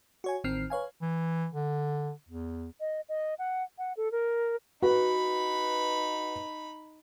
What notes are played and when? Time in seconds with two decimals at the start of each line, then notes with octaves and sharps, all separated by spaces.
0.24 F#4 C#5 G#5
0.44 A1 D#3 C4 F6 C7
0.70 B4 C#5 F5 G#5
1.01 E3
1.53 D3
2.28 E2
2.80 D#5
3.09 D#5
3.39 F#5
3.78 F#5
3.97 A4
4.12 A#4
4.82 D#4 F#4 B4 B5